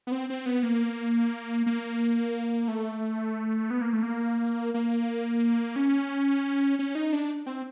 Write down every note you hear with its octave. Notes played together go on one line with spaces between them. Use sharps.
B3
C4
C4
B3
A#3
A#3
A3
B3
A#3
A3
A#3
A#3
C#4
C#4
D#4
D4
C4